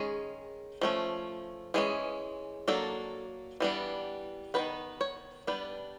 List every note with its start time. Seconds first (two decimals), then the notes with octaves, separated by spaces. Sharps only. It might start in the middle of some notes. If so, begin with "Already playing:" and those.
Already playing: D#3 G#3 C#4 G#4
0.81 F3 A3 C#4
1.74 E3 G#3 C#4 G#4
2.68 F#3 A#3 D4 A4
3.60 E3 G3 B3 D4
4.54 D#3 G#3 B3 B4
5.01 C#5
5.47 G3 B3 D4 B4